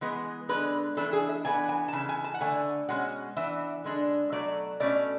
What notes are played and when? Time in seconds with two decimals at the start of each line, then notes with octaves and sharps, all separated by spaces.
0.01 E3 G#3 B3
0.49 D3 G#3 D4 B4
0.97 E3 A3 D4 A4
1.13 G#4
1.29 E5
1.45 E3 B3 D4 G#5
1.69 G#5
1.88 A5
1.93 C#3 E3
2.09 G#5
2.24 A5
2.34 F#5
2.41 D3 A3 D4 G#5
2.89 B2 G#3 C#4 F#5
3.36 E3 B3 D4 E5
3.84 D3 G#3 D4
4.32 B2 F#3 A3 D5
4.80 B2 A3 C#4 D5